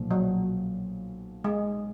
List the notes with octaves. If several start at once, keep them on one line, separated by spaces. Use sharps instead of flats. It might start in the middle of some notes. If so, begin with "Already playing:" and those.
Already playing: B1 A#2 F3
F#3
G#3